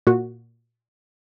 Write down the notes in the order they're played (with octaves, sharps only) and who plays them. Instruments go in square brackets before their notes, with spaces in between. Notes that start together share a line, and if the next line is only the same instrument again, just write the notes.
[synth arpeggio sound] A#2 F#4